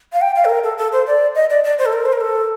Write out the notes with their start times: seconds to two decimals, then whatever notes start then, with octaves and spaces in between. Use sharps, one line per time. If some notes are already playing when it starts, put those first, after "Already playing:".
0.13 F5
0.21 G5
0.36 F5
0.45 A4
0.49 A#4
0.64 A4
0.78 A4
0.92 C5
1.07 D5
1.35 D#5
1.50 D5
1.64 D5
1.78 C5
1.86 A4
1.93 A#4
2.05 C5
2.13 A#4
2.21 A4